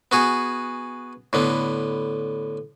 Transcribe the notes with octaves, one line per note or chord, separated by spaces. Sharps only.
B3 F#4 G#4
A2 D3 B3